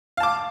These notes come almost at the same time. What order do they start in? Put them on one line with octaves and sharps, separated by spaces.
F5 A5 D6